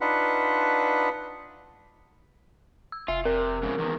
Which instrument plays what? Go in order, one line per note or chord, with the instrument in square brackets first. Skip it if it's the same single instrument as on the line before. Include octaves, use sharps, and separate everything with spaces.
[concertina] D4 D#4 F4 B4 E5 F#5
[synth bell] E6
[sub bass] F1 [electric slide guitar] F4 [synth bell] E5
[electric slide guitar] C3 [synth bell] A#4
[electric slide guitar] G#2 C#3
E2 D#3